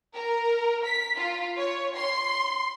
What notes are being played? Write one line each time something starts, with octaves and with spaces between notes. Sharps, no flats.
A#4
B6
F4
C#5
C6